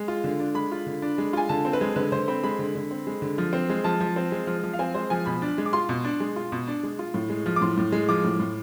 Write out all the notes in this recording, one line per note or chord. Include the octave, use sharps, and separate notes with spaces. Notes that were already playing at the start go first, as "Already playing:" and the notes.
Already playing: G#3
F4
D3
D4
G#3 B5
F4
D3
D4
G#3
F4 G#5
D3 A5
C4
B4
G#3
D3 B4
D3 C5
C4 B5
G#3 B5
D3
D3
C4
G#3
D3
F3
C4
G#3
F3 A5
F3
C4
G#3
F3
F3
F5
C4 G#5
G#3 C5
F3 G#5
B2 B5
D4
G#3
D6
F4 C6
B2
D4
G#3
F4
B2
D4
G#3
F4
A2
G#3
F3
D6
A2 C6
A2
G#3
F3 D6
A2
A2